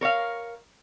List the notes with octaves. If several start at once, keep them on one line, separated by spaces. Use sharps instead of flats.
A#4 C#5 D#5 F5